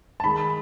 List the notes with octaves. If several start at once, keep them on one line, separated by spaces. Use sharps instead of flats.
A5
D#3 G#3 B5